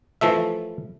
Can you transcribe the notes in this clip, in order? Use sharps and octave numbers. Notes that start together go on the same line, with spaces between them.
E3 F3 A3 E5